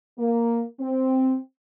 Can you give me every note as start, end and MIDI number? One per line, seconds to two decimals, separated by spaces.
0.19 0.62 58
0.80 1.37 60